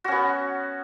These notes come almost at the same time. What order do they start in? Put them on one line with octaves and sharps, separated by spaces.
F#4 C#4 B3